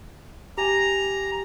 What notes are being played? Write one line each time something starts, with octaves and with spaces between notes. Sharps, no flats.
G4 G#5 A#5